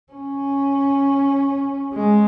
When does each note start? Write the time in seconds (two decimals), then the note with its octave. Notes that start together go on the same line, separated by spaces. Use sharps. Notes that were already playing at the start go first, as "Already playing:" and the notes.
0.12 C#4
1.94 G#3